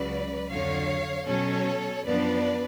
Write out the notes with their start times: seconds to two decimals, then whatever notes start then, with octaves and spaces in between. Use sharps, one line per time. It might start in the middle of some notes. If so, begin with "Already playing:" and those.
Already playing: C#2 C#3 F#3 B4 D5
0.50 F2 D3 F#3 C#5 F5
1.27 B2 F#3 C#4 A4 C#5
2.04 F#2 F3 B3 D4 B4 D5